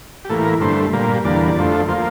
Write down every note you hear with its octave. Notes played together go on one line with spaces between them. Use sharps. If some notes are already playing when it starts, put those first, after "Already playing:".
G4
A2 E3 A#3 A4
A#4
G2 D3 A3 C5
A#2 G3 A#3
E2 D3 G3 A#3 D5
D5
F2 D3 F3 A3
F3 A#3 C5